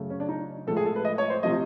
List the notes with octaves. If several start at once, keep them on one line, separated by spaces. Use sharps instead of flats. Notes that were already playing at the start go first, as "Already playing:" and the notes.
Already playing: F#2 C#3 F#3 A3
C#4
D4
D#4
A2 F3 G#3 A4
G#4
A4
B4
D#5
C#5
C5
C3 F3 A3 D#5